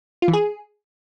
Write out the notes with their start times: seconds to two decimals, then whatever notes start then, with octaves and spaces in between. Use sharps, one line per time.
0.22 F4
0.28 E3
0.33 G#4